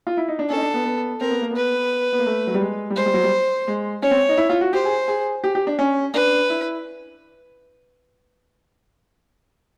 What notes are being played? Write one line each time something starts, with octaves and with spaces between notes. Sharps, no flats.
F4
E4
D#4
D4
C#4 A4
D#4
D4
B3
B3
C4 A#4
B3
A#3
B3
B4
B3
A#3
A3
F#3
G3
G#3
G3
G#3 C5
G3
F#3
G3
G#3
C#4 C#5
C4
D#4
E4
F4
F#4
G4 C5
G#4
G#4
G4
G4
D4
C#4
D4 B4
E4